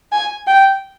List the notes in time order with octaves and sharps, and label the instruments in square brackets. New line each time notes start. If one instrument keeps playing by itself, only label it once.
[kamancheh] G#5
G5